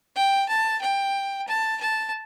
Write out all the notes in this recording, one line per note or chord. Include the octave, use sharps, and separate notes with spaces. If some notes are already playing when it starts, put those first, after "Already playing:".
G5
A5
G5
A5
A5